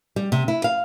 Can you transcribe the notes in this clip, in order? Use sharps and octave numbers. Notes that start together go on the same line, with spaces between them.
G3
C3
E4
F5